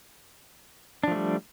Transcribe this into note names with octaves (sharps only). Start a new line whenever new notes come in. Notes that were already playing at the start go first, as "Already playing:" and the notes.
F3 G3 A3 D4